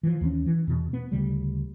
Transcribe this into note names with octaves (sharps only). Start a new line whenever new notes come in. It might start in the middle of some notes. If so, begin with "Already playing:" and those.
E3 F3
D#2 E3 F3 C#4
E3
E2 B2
B3
D2 C#3 G3